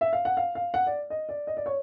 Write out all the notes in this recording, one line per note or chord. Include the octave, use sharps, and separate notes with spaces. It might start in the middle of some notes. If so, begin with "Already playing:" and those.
E5
F5
F#5
F5
F5
F#5
D5
D#5
D5
D#5
D5
C#5